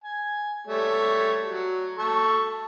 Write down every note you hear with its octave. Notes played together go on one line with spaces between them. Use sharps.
G#5
G3 A3 C#5
F#3
A4 C#6